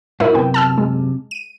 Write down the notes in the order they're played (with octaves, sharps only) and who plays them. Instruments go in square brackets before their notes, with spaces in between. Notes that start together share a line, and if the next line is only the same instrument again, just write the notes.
[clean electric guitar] G#2 D#4 F#4 [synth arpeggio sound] E4 A#4
[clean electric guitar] F#2 C3 [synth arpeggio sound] B3 G5
[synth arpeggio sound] A5 E6 F6
G#3
D#7